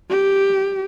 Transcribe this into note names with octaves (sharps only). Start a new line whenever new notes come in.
G4